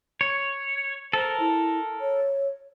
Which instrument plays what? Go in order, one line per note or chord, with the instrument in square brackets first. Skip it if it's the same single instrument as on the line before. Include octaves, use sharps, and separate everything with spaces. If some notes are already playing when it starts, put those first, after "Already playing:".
[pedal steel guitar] C#5
[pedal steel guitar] A4 A#4 [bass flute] C5
[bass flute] E4
C#5